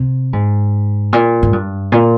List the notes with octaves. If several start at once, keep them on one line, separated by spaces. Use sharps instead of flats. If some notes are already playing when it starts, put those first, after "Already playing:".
Already playing: C3
G#2
A#2
G#2
G2
A#2